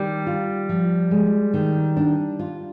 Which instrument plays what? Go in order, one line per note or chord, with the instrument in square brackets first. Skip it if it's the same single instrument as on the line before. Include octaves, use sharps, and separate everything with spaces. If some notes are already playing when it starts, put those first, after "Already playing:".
Already playing: [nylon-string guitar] D#3 [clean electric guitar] G3
[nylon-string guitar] F4
F3
G#3
D#3
D4
F4